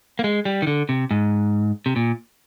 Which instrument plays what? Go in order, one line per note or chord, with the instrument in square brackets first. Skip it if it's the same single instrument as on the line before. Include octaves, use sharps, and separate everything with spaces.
[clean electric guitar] A#3
G#3
G3
D#3
D3
C3
G#2
C3
A#2